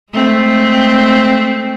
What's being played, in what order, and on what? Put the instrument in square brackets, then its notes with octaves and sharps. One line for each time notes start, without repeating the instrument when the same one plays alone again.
[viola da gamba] G#3 A3 C4